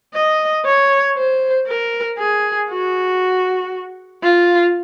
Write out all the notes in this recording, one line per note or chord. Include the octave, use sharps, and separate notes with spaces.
D#5
C#5
C5
A#4
G#4
F#4
F4